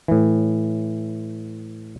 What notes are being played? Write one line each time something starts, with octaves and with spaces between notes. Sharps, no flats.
A2 E3